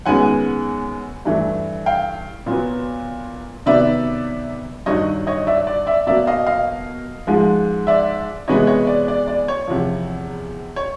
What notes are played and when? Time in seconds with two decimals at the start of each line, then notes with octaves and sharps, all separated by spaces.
0.06 F#2 D#3 G#3 B3 F#5 G#5
1.25 G2 E3 A3
1.86 F5 G5
2.46 A#2 F#3 B3
3.66 C3 D#3 F#3 B3 D5 E5
4.86 G2 D#3 F#3 C#5 D#5
5.27 C#5 D#5
5.47 D5 E5
5.67 D5
5.87 D5 E5
6.06 B2 F#3 A#3 D5 E5
6.27 D#5 F5
6.47 D#5 F5
7.27 G#2 F3 G#3
7.87 D5 E5
8.48 C3 E3 G#3 B3 C#5 D#5
8.67 C#5 D#5
8.87 D5
9.08 D5
9.28 D5
9.48 C#5
9.67 E2 C3 F3
10.76 C#5